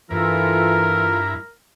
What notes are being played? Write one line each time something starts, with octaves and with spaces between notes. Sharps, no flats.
G2 E3 E4 F4 A4 A#4 A#5